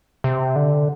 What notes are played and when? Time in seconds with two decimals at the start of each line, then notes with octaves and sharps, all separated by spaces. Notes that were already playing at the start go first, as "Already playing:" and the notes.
0.24 C3
0.56 D3